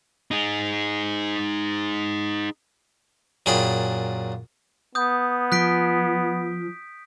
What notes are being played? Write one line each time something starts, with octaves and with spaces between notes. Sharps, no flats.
D#4 G#4
F#2 A#2 G#4 G5 B5
B3 D#6 G6
F3 F#6 B6 D7